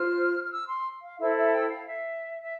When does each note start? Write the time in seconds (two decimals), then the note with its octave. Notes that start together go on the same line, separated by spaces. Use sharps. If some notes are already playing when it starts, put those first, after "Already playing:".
Already playing: F4 C5 F6
0.43 F6
0.52 E6
0.68 C6
1.02 F5
1.19 E4 A4 C5 E5
1.36 E5
1.46 A5
1.52 G5
1.69 F5
1.86 E5
2.41 E5